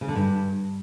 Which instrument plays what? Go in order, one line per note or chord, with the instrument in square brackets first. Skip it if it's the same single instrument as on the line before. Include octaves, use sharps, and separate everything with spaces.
[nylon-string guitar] C#3
D3
G2